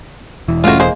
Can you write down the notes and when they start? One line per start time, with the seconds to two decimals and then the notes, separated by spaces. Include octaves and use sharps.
0.48 E1 E3
0.64 G#3 A3 C#4 F4 F#4
0.80 G#3 A#3 C5